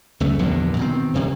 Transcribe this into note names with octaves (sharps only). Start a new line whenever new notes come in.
C#2 F#2 A3
A#1 E2 G2 D3
B2 D#3 C4
D#1 C3